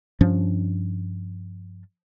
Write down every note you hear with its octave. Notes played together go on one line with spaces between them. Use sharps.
G2 F3 C#4 D4